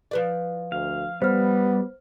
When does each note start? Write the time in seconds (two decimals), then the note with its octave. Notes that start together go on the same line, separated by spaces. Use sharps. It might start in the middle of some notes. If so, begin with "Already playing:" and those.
0.11 F3 B4 D5
0.72 D2 F5
1.22 G3 B3 C5 F6